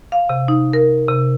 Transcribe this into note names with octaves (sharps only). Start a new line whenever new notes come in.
F5
C3
D#4
A#4
C3